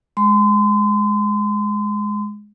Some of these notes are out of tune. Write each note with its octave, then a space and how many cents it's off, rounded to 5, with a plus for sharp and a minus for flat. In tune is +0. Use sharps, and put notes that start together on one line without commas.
G#3 +0 C6 -35